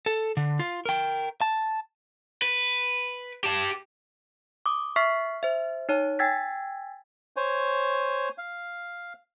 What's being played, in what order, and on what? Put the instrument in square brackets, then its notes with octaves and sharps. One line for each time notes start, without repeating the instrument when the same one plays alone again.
[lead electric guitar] A4
D3
F4
A#4 G5
A5
[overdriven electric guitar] B4
G4 A5
[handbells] D6 D#6
E5 C#6 F6 B6 C7
C5 E5
D#4 C#5 A5
G5 G#5 E6 G#6 A6 B6
[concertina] C5 C#5 G#5
F5